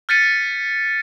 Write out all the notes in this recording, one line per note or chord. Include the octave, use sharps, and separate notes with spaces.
F6 G6 A6 B6 C#7 D#7